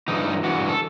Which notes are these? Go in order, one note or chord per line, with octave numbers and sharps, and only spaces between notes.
G2 E3 D#4
G2 E3 F#4
A4